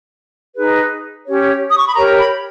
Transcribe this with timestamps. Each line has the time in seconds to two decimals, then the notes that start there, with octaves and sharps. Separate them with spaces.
0.56 D#4 G#4 B4
1.26 C#4 G4 C#5
1.71 D#6
1.78 C#6
1.87 B5
1.95 G4 A#4 C#5 A#5
2.19 B5